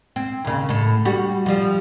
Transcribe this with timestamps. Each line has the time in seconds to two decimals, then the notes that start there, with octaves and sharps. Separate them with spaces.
0.16 C4
0.45 D#2 C#3
0.69 A2 A4
1.05 G3 F#4
1.46 F3 G3